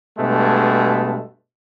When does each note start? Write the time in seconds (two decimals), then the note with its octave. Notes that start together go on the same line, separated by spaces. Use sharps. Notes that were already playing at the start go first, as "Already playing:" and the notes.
0.18 G2 B2 G#3 A3